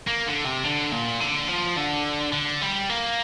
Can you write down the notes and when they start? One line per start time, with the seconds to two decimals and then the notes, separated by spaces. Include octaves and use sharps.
0.08 A#3
0.27 D3
0.45 C3
0.64 D3
0.92 A#2
1.21 D3
1.49 F3
1.77 D3
2.33 D3
2.61 G3
2.90 A#3